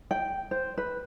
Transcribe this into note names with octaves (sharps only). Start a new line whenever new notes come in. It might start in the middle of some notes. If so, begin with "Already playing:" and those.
G5
C5
B4